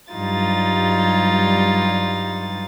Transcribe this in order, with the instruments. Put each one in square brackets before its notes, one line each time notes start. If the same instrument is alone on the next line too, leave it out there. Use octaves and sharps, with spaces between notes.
[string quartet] G2 F#3 G3 D#4 F4 A6